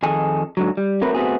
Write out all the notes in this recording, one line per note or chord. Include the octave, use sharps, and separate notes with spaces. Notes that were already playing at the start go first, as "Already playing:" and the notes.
F2 D#3 G#4 A4 D#5 G#5
G#2 D3 F#3
G3
F#3 A3 C4 A#4 B4
A3 B3 C4 F#4 G#4